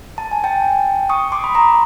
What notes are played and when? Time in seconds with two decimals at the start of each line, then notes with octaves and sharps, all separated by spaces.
0.18 A5
0.31 G#5
0.44 G5 A5
1.09 C#6 D#6
1.32 C6 D6
1.44 B5
1.54 A#5 C6